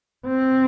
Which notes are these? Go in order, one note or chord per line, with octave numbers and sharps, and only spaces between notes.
C4